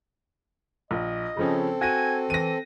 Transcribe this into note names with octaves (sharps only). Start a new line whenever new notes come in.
A#1 D#5
C#3 F3 C4 C#4 A4
F#4 G#5 A#6 D#7
E3 A#6 D#7